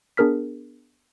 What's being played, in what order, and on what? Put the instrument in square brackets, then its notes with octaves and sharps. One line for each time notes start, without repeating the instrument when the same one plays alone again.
[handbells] B3 D4 G#4 A#4 F6 B6